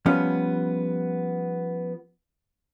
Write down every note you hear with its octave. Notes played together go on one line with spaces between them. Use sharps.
F3 G3 B3 C#4